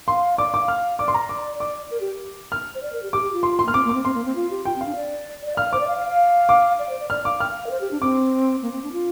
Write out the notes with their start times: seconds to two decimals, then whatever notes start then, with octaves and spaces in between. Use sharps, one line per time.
0.08 F5 C6
0.38 D5 D6
0.48 F5
0.54 D6
0.59 F5
0.68 F6
0.99 D5 D6
1.08 C6
1.14 A#5
1.29 D6
1.60 D6
1.91 A#4
2.01 G4
2.52 F6
2.75 C5
2.83 D5
2.93 A#4
3.03 G4
3.13 G4 D6
3.23 G4
3.33 F4
3.43 C6
3.59 C6
3.66 A#3 F6
3.74 C4 D6
3.85 A#3
3.89 D6
3.94 C4
4.05 C4 C6
4.15 A#3
4.25 C4
4.36 F4
4.50 G4
4.65 F4 G5
4.76 C4
4.81 F5
4.86 D4
4.96 D5
5.46 D5
5.57 F5 F6
5.73 C5 D6
5.80 D5
5.88 F5
5.98 F5
6.08 F5
6.49 D6
6.79 D5
6.89 C5
6.99 D5
7.10 D5 F6
7.25 F5 D6
7.40 G5 F6
7.50 F5
7.61 F5
7.66 A#4
7.71 C5
7.81 G4
7.91 D4
8.01 C4 D6
8.62 A#3
8.72 C4
8.83 D4
8.93 F4